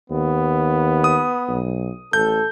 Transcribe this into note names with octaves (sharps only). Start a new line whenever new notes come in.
D#2 B3
D#6
B1
A1 A4 G6